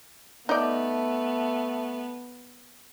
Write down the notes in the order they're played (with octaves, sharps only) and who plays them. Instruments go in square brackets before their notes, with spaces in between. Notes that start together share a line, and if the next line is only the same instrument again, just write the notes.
[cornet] A3 [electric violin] B3 [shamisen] D#4 D5